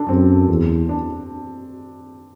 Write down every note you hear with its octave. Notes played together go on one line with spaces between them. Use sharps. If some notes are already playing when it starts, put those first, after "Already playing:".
Already playing: D4 A4
F#2 C4
E2
D4